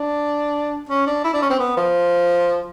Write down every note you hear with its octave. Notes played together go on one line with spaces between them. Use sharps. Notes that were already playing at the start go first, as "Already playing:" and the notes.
Already playing: D4
C#4
D4
E4
D4
C#4
C4
B3
F3